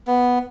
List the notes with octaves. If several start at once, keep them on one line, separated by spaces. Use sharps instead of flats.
B3